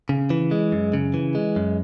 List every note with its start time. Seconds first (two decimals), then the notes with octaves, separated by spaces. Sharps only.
0.09 C#3
0.30 E3
0.51 G#3
0.72 F#2
0.93 C#3
1.14 E3
1.35 G#3
1.56 F#2